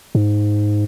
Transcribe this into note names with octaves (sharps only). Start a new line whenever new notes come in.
G#2